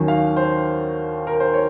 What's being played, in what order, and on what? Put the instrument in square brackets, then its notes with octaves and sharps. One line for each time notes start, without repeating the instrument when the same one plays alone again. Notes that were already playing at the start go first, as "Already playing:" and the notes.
Already playing: [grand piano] D#2 D#3 F#3 C#4
F5
C5
A#4
C5
C#5